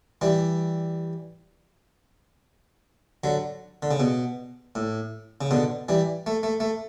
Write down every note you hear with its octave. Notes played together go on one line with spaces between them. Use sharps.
E3 G3
D3 F#3
D3
C#3
B2
A2
C#3
B2 D3
E3 G3
A3
A3
A3